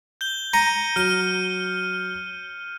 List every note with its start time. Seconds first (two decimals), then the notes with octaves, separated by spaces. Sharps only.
0.21 G6 G7
0.53 A#5 C#7 D#7
0.96 F#3 F6 D#7